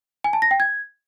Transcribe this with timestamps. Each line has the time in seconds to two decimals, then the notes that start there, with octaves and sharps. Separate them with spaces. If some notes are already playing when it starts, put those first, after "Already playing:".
0.24 G#5
0.33 A5
0.42 A#6
0.51 G5
0.60 G#6